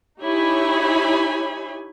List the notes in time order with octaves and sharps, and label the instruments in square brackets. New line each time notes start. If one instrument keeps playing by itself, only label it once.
[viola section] D#4 E4 G4 C#5 G#5 B5